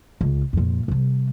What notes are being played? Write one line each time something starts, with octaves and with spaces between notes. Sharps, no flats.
C#2
F2 A#2
C3 G3